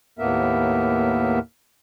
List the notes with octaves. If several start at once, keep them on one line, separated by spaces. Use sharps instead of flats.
D#2 A2 A#3 B3 A#4 E5